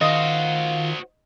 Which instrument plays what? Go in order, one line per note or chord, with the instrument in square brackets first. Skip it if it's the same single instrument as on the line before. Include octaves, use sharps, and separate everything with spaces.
[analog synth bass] D#3 [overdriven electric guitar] F4 [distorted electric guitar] F#4 C5 [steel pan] D#5